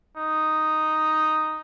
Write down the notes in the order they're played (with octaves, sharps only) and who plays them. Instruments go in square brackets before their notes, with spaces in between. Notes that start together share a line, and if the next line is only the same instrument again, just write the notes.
[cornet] D#4